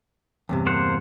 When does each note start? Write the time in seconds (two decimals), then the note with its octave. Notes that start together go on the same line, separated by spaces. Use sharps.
0.49 E2 G2 C3
0.66 A#3 C5 F#5